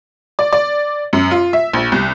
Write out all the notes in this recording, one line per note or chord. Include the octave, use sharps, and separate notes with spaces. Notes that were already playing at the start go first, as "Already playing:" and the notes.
D5
D5
F#2
F4
E5
A#1
C2